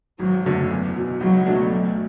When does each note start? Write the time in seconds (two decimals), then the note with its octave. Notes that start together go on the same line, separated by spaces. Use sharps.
0.19 G#1 F#3
0.45 F#2 D3 A3
0.70 E2
0.96 B2 F#3
1.21 C#2 F#3
1.46 B2 A3 D4
1.72 D2